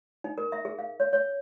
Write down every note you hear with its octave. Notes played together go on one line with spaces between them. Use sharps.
D#4
A#4
E5
G#4
F5
C#5
C#5